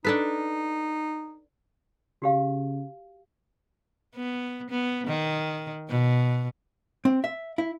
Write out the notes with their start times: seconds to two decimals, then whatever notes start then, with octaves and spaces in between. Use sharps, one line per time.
0.05 D4 D#4 A4 B4
2.22 C#3 F#4 G4 F5
4.16 B3
4.70 B3
5.07 D#3
5.89 B2
7.05 C4
7.24 E5
7.58 E4